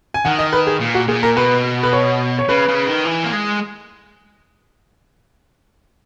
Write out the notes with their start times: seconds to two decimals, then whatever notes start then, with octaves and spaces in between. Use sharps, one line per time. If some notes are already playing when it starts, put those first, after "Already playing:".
0.14 G#5
0.25 D#3 F#5
0.39 D#5
0.53 B4
0.67 G#4
0.80 A#2
0.95 F#4
1.08 A#2 G#4
1.23 A#4
1.37 B2 B4
1.83 B4
1.93 C#5
2.39 C#5
2.49 C#3 B4
2.68 C#3
2.87 D#3
3.05 E3
3.24 A#3
3.33 G#3